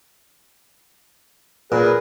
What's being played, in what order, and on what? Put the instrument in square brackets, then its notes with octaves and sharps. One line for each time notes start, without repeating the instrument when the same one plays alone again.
[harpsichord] A#2 [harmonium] G#4 A#4 B4